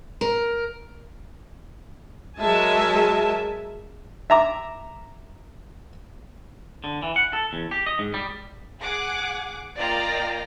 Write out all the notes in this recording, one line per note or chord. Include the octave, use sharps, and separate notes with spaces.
A#4
F#3 G#3 A#4 E5 G#5 A5
E5 A#5 D6
D3
E3
F#5
A4
E2
G4
D#5
G#2
G3
G#4 F#5 D6
A#3 F4 D5 D#5 G5 A#5